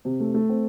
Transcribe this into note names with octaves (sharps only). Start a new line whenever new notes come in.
C3
A3
A3
C4